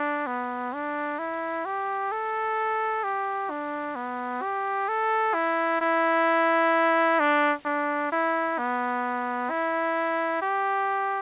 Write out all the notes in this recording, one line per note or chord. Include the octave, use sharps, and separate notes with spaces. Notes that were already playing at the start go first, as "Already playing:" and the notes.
Already playing: D4
B3
D4
E4
G4
A4
G4
D4
B3
G4
A4
E4
E4
D4
D4
E4
B3
E4
G4